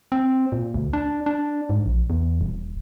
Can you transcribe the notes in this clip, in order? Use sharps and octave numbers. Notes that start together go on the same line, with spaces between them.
C4
A#2
D2
D4
D4
G#2
A#1
E2
D#1